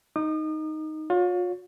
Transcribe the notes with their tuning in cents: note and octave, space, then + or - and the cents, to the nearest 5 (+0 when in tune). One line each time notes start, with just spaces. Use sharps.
D#4 +0 D#6 -40
F4 +40 C#5 +15